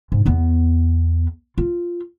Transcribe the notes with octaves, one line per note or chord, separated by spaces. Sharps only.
G#2
E2 B3
F4